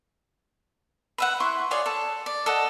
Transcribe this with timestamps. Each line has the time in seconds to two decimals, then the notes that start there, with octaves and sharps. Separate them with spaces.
1.18 B4 E5 F#5
1.40 E4 C6 C#6
1.71 F4 G#4 C#5 D5
1.86 A4
2.26 D5
2.46 A4 D#5 F#5